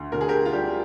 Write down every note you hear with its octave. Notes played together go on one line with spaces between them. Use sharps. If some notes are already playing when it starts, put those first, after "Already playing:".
Already playing: D2
D2 A#4
G#4
G4 A#4
F4
G3 G4